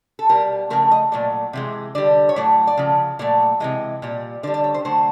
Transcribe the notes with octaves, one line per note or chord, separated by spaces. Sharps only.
A4
B2 G3 A#4
C#3 F3 A3 A#4
D#5
A#2 F#3 A3 D5
C3 E3 G#3
D3 G3 D5
C#5
A2 F#3 A3 D5
D5
C#3 F3
A#2 F#3 A3 D5
C3 E3 G#3 D#5
A#2 G3
D3 G3 D5
D5
C#5
C5
D3 F#3 A3 C5